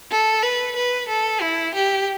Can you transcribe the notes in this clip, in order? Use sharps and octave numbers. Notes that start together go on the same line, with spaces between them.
A4
B4
B4
A4
E4
G4